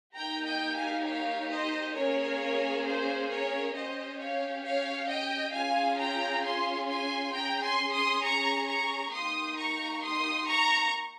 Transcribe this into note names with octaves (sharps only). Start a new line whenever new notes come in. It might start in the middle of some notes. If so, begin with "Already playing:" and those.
A#3 D#4 G4 G5 A#5
D#5 G5
F5 G#5
C#5 F5
C5 D#5
A#3 C#4 G#4 A#4 C#5
C5
A#4 C#5
C#4 G4 C5 D#5
C#5 F5
C#5 F5
D#5 G5
C#4 F4 G#4 F5 G#5
G5 A#5
G#5 C6
G#5 C6
C#4 G#4 G5 A#5
G#5 C6
C6 D#6
A#5 C#6
A#5 C#6
A#3 D#4 G4 C6 D#6
A#5 C#6
C6 D#6
A#5 C#6